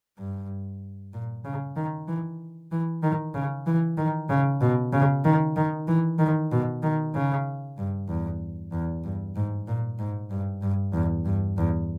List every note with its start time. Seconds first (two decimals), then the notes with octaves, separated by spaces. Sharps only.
0.18 G2
1.13 A#2
1.45 C#3
1.76 D#3
2.08 E3
2.72 E3
3.03 D#3
3.34 C#3
3.66 E3
3.97 D#3
4.29 C#3
4.61 B2
4.93 C#3
5.24 D#3
5.56 D#3
5.88 E3
6.19 D#3
6.52 B2
6.83 D#3
7.14 C#3
7.78 G2
8.08 E2
8.72 E2
9.04 G2
9.36 G#2
9.68 A#2
9.99 G#2
10.31 G2
10.62 G2
10.93 E2
11.25 G2
11.58 E2